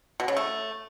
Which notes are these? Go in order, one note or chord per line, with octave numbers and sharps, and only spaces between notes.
B2
C#3
A3